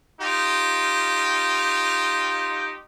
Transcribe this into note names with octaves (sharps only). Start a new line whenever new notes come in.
D#4 F4 G4